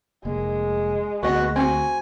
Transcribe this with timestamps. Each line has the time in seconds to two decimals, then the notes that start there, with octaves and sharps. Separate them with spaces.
0.25 F1 G#3 A#3
1.23 D2 A#3 B3 F#4 D#5
1.56 C4 F#4 G#5